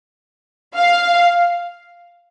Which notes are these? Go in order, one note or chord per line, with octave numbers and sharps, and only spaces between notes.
F5